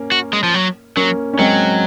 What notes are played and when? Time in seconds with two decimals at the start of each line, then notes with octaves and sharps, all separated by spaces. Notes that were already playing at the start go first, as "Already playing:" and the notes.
Already playing: A#3 C#4
0.12 F#4
0.33 G#3
0.43 F3
0.54 F#3
0.96 F#3 A#3 C#4
1.33 C#4
1.39 F#3 G#3 C4